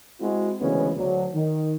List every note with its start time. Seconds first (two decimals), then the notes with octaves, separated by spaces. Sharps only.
0.21 G#3 C4 E4 F#4
0.61 D2 C#3 E3 G#3 B3 C#4
0.97 D2 F#3 D4
1.34 D#3